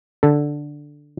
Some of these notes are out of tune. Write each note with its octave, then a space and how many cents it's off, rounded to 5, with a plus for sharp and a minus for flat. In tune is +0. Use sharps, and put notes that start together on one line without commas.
D3 +0 A4 +0